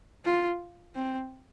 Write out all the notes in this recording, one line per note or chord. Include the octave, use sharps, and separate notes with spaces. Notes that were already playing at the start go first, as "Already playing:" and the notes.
F4
C4